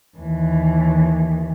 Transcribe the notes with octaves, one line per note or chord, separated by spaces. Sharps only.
D#2 E3